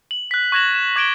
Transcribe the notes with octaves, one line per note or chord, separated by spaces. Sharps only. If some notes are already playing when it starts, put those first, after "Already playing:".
F#7
F#6 B6
C#6 F#6 G#6 A#6 E7 F#7
E7
D6 G#6 B6 D7 E7 G7